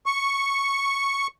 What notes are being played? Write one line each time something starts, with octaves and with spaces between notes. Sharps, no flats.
C#6